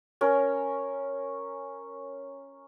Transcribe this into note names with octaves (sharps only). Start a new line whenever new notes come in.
C#4 A#4